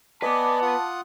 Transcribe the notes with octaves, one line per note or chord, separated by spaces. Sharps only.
B3 B4 D5 D#5 G#5 A5 D6
F4 F#5 D#6